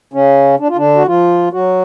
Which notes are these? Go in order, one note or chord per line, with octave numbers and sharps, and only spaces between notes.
C#3 C#4
D4
F4
D3 D4
F#4
F3 F4
F#3 F#4